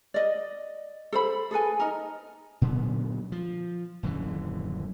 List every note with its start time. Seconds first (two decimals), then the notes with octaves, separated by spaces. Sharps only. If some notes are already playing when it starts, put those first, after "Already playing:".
0.14 D5 D#5
1.12 A4 C5 B5
1.51 G#4 A4 B4 G#5
1.80 D#4 A#4
2.61 A#2 D3 F#3 B3
3.32 F3
4.03 D#1 F#2 D3 E3